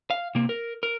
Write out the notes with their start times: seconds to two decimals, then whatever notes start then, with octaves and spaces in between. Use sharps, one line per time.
0.10 F5
0.35 C3 A#3
0.49 A#4
0.83 A#4